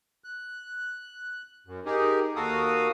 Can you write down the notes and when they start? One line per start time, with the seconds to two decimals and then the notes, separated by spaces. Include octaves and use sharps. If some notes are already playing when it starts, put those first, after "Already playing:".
0.24 F#6
1.67 F#2
1.86 D#4 G4 G#4 A#4
2.36 D#2 F#4 A4 A#4 F5 D#6